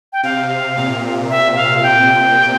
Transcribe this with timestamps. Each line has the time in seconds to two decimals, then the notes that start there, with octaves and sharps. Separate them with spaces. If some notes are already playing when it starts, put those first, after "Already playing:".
0.13 G5
0.23 C3 F5
0.77 A#2
1.30 E5
1.56 F5
1.83 G5